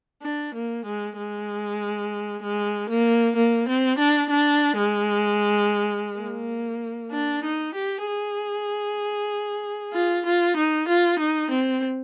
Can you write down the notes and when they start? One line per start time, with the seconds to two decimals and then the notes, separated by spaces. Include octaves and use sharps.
0.22 D4
0.54 A#3
0.85 G#3
1.17 G#3
2.43 G#3
2.89 A#3
3.36 A#3
3.68 C4
3.99 D4
4.30 D4
4.77 G#3
6.19 A#3
7.12 D4
7.44 D#4
7.74 G4
8.07 G#4
9.94 F4
10.26 F4
10.57 D#4
10.88 F4
11.19 D#4
11.51 C4